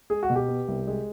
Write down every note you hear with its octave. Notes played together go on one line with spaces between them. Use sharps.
G#3 G#4
F#4
B2
G4
B3
C2
G#3